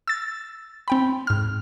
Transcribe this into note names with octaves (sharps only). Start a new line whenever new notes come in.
E6 A6
C4 G5 B5
G#2 F6